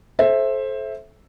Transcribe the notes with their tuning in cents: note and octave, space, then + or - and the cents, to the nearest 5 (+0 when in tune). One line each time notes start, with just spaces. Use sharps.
A4 -25 C5 +20 E5 +0